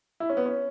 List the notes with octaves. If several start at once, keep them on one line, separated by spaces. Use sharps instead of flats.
E4
C#4
B3
C#4